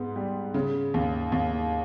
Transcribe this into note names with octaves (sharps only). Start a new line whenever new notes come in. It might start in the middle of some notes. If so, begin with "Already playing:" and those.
Already playing: G#2 B3
G3
C#3
D#2
D#2